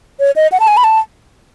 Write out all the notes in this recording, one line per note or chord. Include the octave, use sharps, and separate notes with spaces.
C#5
D#5
F#5
A5
G#5
B5
A5